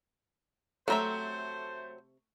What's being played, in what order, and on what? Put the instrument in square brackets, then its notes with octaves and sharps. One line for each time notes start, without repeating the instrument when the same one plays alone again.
[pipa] C3 A#5 [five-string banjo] F#3 C4 E5 [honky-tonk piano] A3 [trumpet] C5